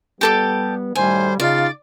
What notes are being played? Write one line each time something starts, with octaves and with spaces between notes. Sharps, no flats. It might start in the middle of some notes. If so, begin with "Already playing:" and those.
G3 B3 G4 A4 D6
F#2 A2 D#3 G3 C5 G#5
C#3 D#4 F4 D5 F5